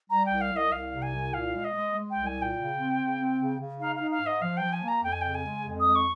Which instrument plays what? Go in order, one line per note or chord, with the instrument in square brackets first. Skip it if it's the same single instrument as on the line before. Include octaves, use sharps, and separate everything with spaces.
[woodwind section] G3 [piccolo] A#5
[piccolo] G5
[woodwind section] C2
[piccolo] F5
[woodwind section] C2 [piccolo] D#5
[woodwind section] C2 [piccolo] F5
[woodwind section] C3
[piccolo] G#5
[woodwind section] C2
[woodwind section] A#2 [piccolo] F5
[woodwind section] G#3
[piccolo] D#5
[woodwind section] G#3
G#3
[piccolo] G5
[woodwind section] C2
[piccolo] G#5
[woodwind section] A#2
[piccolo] G5
[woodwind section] C#3
C4
C#3
C4
C#3
C#3
[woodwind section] D#4 [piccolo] F5
[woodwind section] D#4 [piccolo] F5
[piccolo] F5
[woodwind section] G#2
[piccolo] D#5
[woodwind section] F3 [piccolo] F5
[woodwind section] F3 [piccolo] G5
[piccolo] G#5
[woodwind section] A#3 [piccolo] A#5
[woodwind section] F2 [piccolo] G5
[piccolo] G#5
[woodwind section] C#3 [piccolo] G5
[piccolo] G#5
[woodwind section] G#3
F2
[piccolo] D#6
[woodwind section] G#3
[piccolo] C#6